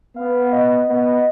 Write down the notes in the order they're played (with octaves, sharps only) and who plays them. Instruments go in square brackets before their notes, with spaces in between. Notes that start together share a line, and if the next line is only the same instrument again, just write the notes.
[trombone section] B3 [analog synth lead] F5
[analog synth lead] D#5
[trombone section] B3